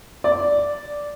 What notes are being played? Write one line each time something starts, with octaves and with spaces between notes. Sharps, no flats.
D5